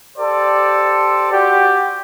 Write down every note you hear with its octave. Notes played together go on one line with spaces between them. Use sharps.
G4 A4 C5 D5
F#4 G4